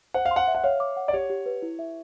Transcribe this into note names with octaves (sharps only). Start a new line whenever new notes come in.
C5 F#5
F5
C6
F#5
E5
F#5
C#5 F5
D6
F#5
D5
G4 C#5
G4
B4
E4
E5